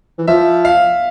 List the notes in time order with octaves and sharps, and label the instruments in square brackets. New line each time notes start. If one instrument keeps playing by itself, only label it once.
[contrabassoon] E3
[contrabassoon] F3 [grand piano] E5
[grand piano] F5